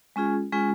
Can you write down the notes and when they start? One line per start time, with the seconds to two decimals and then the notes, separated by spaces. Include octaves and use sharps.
0.16 G#3 C#4 F4 G#4
0.52 G#3 C#4 F4 G#4